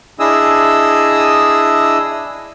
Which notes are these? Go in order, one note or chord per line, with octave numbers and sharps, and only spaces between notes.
D4 E4 G#4 D#5 D#6 E6